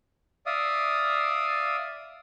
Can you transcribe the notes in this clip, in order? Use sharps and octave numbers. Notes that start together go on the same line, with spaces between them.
D5 E5 F5 D#6